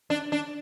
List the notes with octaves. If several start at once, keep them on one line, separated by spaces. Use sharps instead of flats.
D4
D4